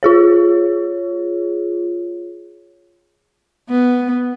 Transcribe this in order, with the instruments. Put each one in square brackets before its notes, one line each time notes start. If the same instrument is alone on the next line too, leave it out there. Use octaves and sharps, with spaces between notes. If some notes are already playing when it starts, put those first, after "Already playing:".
[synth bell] F4 G#4 C#5
[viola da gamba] B3